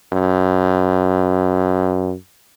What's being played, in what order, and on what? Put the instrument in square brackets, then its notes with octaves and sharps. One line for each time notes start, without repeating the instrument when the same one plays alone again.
[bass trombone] F#2